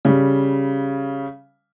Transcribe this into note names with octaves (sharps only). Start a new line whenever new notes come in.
C#3 G3